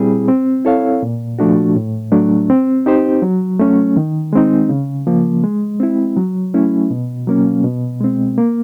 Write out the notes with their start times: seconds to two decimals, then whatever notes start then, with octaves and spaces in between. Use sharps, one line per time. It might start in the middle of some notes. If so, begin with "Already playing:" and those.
Already playing: A#2 G3 C4 E4 G#4
0.28 C4
0.65 E4 A4 C#5 F5
1.03 A#2
1.39 F3 A3 D4 F#4
1.76 A2
2.12 F#3 A3 D4
2.50 C4
2.86 D#4 G4 C5
3.22 F#3
3.60 A3 C#4
3.97 D#3
4.33 G#3 C4 D#4
4.69 C#3
5.07 F3 A#3
5.44 G#3
5.80 C4 E4
6.17 F#3
6.54 A3 C#4 E4
6.91 B2
7.27 F#3 A#3 C#4
7.64 B2
8.01 G#3 C4
8.38 A#3